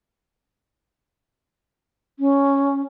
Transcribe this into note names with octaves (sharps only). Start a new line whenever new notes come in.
C#4